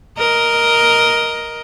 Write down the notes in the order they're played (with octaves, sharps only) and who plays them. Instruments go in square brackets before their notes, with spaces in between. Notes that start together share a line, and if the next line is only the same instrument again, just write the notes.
[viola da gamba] A#4 D#5